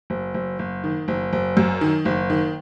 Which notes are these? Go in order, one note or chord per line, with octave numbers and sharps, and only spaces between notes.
F#1
F#1
F#1
D#3
F#1
F#1
F#2
D#3
F#1
D#3